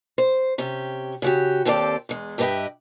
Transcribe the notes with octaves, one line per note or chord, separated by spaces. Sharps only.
C5
C3 C#4 G4
C#3 F#4 G4
D#2 C4 G4 A4 C#5 D5
E2 G#3
G2 G4 B4 D#5 E5 G5